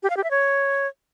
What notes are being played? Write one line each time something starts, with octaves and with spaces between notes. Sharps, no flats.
G4
F5
G4
E5
C#5